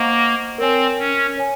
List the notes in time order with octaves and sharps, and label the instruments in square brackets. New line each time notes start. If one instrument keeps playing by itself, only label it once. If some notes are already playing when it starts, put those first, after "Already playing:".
Already playing: [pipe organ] A#3 [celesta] C5 D#5 F#5 A#5 C#6
[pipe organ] C4 [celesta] A#4 C#5 G#5
[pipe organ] C#4
[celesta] C#5 G#5